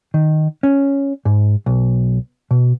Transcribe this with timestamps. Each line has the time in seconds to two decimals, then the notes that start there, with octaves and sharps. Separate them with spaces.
0.14 D#3
0.63 C#4
1.25 G#2
1.66 B1
2.51 B2